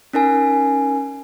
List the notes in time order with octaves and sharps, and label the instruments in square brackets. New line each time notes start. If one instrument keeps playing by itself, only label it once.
[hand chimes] C#4 D#4 A#4 G#5